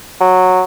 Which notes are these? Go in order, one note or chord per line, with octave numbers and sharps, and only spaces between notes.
F#3